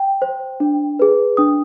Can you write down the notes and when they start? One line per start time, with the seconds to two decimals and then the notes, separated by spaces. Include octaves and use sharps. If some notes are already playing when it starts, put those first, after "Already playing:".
Already playing: G5
0.22 C5
0.60 D4
0.99 G#4 B4
1.37 D4 D#6